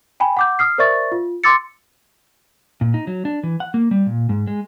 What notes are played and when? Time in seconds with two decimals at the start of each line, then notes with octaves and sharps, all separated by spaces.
0.20 G5 G#5 B5
0.37 F#5 D6 G6
0.59 D#6 F6 C7
0.78 A#4 C5 D5 E5 C#6 A6
1.12 F4
1.44 C6 D6 E6 A6 C#7
2.81 A#2
2.94 D#4
3.07 F#3
3.25 D4
3.43 E3
3.60 F#5
3.74 A#3
3.91 G3
4.06 A#2
4.29 G#2
4.47 G#3